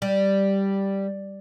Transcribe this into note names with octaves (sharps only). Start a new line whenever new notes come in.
G3